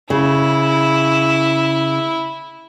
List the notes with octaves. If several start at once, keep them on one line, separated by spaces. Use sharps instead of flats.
C#3 E4